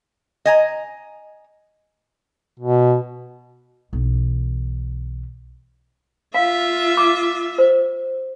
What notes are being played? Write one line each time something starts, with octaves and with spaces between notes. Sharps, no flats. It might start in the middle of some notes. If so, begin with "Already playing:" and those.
D#5 G#5 A#5
B2
B1 E3
F4 E5 F5
D6
C5